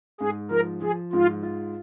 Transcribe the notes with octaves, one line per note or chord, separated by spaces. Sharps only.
G#2 G#4
F3 A#4
F3 G#4
G#2 F4
F4